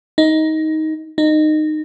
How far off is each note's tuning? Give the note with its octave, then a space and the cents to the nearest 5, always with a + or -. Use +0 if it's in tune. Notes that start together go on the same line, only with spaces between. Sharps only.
D#4 +15
D#4 -20